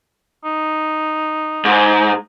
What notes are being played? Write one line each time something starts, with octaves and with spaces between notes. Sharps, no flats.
D#4
G#2